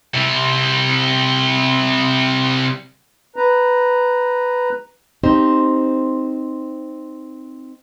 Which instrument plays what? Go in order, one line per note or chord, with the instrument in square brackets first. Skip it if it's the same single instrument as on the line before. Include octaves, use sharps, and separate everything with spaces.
[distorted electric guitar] C3 G3
[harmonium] B4 A#5
[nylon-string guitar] C4 D#4 G4 C5